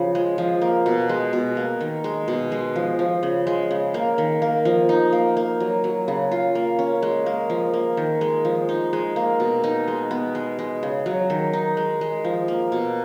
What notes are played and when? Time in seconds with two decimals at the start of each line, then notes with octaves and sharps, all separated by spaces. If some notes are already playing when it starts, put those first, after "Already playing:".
Already playing: C#3 F3
0.15 G#3
0.38 F3
0.62 A#3
0.86 B2
1.09 G#3
1.33 B2
1.57 A#3
1.81 D#3
2.04 G#3
2.28 B2
2.52 G#3
2.76 F3
2.99 F3
3.23 C#3
3.47 G#3
3.71 C#3
3.94 A#3
4.18 D#3
4.42 A#3
4.65 F3
4.89 D#4
5.12 A#3
5.37 A#3
5.60 F#3
5.84 F#3
6.08 C#3
6.32 F4
6.55 A#3
6.79 C#4
7.02 G#3
7.26 A#3
7.50 F3
7.73 A#3
7.97 D#3
8.21 G#3
8.45 F3
8.69 D#4
8.93 G#3
9.16 A#3
9.40 B2
9.64 D#4
9.88 G#3
10.11 B3
10.35 G#3
10.59 G#3
10.83 C#3
11.06 F#3
11.30 D#3
11.53 D#4
11.77 G#3
12.01 G#3
12.24 F3
12.48 A#3
12.72 B2